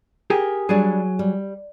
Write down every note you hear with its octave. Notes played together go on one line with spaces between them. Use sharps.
G4 G#4 A#4
F#3 G3 D4 G#4
G3